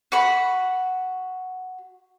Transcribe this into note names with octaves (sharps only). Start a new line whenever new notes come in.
F#4 B5